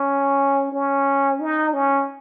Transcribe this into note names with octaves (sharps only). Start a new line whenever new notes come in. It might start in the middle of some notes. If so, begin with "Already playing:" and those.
Already playing: C#4
C#4
D#4
C#4